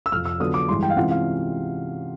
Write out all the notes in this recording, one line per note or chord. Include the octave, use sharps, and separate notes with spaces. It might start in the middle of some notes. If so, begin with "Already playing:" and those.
E6
F2 C3 F3 F6
E6
D3 F#3 B3 D4 F4 D#6
D6
G2 E3 G#3 C6
G5
F5
C3 E3 G#3 C#4 F4 F#5
F5